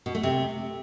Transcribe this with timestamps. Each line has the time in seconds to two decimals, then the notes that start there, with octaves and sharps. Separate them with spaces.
0.06 B2
0.15 A3
0.23 C3